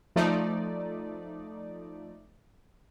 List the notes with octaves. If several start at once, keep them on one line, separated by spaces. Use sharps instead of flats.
F3 A3 D#4 D5